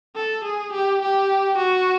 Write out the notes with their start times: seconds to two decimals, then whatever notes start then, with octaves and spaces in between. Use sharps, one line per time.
0.16 A4
0.44 G#4
0.73 G4
1.01 G4
1.58 F#4